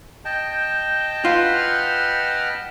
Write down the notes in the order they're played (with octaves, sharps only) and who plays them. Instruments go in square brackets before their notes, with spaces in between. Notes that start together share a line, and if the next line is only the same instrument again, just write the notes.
[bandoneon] D#5 G5 A5 [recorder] G6
[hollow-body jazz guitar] F4 [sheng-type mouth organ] B4 F#5 F6